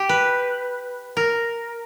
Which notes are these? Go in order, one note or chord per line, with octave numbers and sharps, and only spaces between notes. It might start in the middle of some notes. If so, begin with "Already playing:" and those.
Already playing: G4
B4
A#4